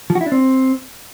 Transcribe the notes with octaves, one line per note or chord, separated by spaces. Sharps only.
F3
F#4
E4
D4
C4